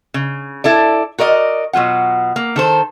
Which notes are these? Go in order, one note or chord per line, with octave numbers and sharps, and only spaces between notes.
C#3
E4 A4 D5
F#4 A#4 D5 D#5
B2 F#3 F4 F#5
A#3
D#3 A4 C5